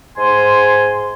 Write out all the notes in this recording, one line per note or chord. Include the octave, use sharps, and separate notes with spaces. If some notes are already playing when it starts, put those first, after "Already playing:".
G#2 G#5 C6